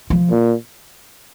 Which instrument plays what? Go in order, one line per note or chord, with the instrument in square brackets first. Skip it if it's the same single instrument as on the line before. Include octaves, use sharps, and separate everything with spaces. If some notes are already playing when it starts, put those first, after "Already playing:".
[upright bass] F3
[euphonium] A#2